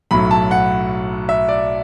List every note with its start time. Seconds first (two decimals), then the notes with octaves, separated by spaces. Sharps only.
0.11 B1 A2 F#3 B5
0.31 A5
0.51 F#5
1.29 E5
1.49 D5